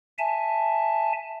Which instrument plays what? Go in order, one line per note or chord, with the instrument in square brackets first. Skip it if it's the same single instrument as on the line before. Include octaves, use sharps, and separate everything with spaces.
[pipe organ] E5 G#5 A5